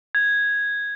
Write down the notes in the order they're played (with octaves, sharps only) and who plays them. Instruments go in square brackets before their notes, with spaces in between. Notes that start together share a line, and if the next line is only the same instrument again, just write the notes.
[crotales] G#6